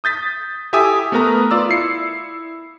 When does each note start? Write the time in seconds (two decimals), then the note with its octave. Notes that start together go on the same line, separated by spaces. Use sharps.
0.04 D#6 G6 A6 B6
0.73 E4 G4 A4 E5 G#5 D#6
1.12 A3 B3 A#4 B4 A#5
1.51 F4 D5 E6
1.69 E4 C7 C#7